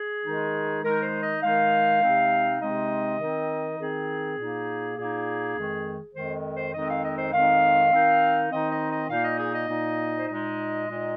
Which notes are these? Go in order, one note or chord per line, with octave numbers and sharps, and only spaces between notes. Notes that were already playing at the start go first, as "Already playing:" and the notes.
Already playing: G#4
D#3 G#3 D#4
D#3 G#3 D#4 A#4
C5
D#5
D#3 G#3 D#4 F5
C3 G#3 C4 D#4
C3 G#3 C4 D#4 D#5
D#3 C4 D#4
D#3 C4 D#4 G#4
A#2 A#3 D#4
A#2 A#3 D#4 G#4
F2 D#3 G#3
F2 D#3 G#3 C5
C5
F2 D#3 G#3 C4 D#4 D#5
F5
D#5
C5
F2 D#3 G#3 C4 D#4 F5
D#3 C4 D#4
D#3 C4 D#4 D#5
D#5
D#5
A#2 A#3 D#4 F5
D#5
G#4
D#5
A#2 A#3 D#4
C5
A#2 G#3 D#4 D#5
A#2 G#3 D#4